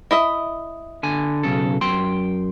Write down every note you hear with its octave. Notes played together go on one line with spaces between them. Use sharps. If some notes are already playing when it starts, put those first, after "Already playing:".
E4 D#5 E5
D3 G#5
B1 C#3 A4
F#2 G5 C6